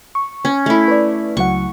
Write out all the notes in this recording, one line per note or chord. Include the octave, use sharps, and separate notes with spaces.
C#6
C#4
A3 E4
B4 D5
C#2 F#3 F#5 C#6